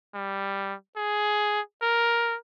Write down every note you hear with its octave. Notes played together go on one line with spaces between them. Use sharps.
G3
G#4
A#4